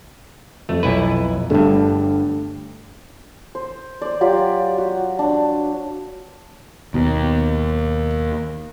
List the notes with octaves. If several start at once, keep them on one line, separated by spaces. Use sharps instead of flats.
F2 A3
B1 E4 B4
G1 G2 A3 D4 A4
C5
C5 D5
F#3 F4 G4
F#4
D4
D#2 B2